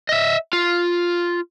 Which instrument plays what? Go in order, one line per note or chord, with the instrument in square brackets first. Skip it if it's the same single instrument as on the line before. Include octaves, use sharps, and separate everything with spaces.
[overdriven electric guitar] D#5 E5
F4